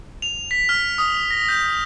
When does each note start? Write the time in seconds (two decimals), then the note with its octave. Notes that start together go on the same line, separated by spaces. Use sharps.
0.22 F7
0.51 B6
0.69 F6
0.98 D#6
1.31 A#6
1.49 G6